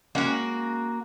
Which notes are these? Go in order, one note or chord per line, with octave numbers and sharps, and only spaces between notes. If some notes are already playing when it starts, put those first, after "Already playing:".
G#3 A#3 C#4 F#4 F#5